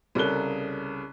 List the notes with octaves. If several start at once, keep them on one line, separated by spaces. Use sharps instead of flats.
C2 C#3 A4 A#4 F#6 G7